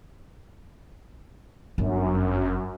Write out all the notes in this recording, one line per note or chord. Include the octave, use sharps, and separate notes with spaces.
G1 F#2